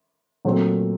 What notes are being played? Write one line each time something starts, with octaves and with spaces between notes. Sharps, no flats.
A#2 F#3 A3 C4